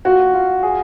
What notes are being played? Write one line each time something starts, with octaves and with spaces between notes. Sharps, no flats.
F4 F#4
F4
G#4